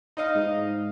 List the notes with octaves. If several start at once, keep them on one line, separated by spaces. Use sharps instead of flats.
D#4 D#5 F5
G#2